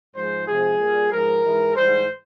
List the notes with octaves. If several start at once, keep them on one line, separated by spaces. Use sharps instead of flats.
G#2 F3 G#3 C5
C3 F3 G#3 G#4
A#2 G3
G#2 F3 G#3 A#4
G#2 E3 G#3
G#2 E3 G3 C5